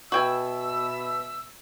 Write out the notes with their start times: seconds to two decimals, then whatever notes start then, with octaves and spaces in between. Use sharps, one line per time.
0.12 B2 F#4 E5 G5 G#5 E6